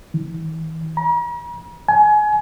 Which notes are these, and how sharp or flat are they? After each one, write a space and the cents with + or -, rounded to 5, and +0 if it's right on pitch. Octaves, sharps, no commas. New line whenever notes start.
E3 -45
A#5 +45
G#5 +25